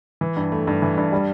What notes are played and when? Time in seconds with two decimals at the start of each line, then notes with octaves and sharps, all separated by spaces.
0.21 E3
0.37 G2
0.52 A3
0.67 G2
0.82 E3
0.97 G2
1.13 G3